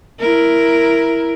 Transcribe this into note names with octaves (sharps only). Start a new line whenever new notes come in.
E4 A#4